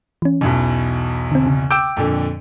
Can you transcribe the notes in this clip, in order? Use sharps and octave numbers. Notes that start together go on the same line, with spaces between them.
E3 C#4
B1 E2 B2
D3 C4
C#3
G5 D6 E6 G6 D7
F2 A#2 D3